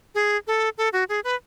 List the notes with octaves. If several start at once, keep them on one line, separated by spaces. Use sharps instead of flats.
G#4
A4
A4
F#4
G#4
B4